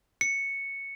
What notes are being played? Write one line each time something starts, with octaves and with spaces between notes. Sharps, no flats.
C#7